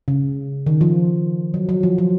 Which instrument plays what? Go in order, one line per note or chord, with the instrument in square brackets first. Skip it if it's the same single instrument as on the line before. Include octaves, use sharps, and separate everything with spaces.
[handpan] C#3
D#3
F3
F#3
F#3
F3
F#3